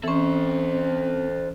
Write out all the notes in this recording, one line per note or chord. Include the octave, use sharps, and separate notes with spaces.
E3 C4 C#4 A4 C5